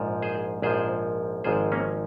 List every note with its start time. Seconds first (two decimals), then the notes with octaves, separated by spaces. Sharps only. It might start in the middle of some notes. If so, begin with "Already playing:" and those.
Already playing: A#1 G#2 F3
0.23 G#4 C5
0.62 A#1 G#2 F3 G#4 C5
1.44 G#1 G#2 F3 G#4 C5
1.72 A#3 C#4